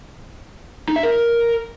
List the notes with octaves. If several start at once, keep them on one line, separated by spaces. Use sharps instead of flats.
D#4
E5
A#4